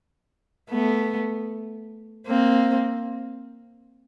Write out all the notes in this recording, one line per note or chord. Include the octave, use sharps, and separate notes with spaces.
A3 B3
A#3 C4